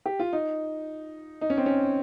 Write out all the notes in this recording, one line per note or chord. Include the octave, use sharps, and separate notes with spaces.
G4
F4
D#4
D#4
C#4
C4
C#4